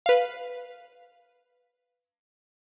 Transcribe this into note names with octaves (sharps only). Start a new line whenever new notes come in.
B4 F5